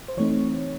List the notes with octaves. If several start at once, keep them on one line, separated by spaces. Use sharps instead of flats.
C5
E3 A3 C4 D#4 C#5